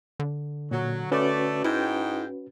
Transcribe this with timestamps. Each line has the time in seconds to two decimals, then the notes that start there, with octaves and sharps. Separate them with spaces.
0.20 D3
0.71 A#2 F#3
1.12 A3 C#4 F#4 B4 D5
1.64 G#2 E4 G5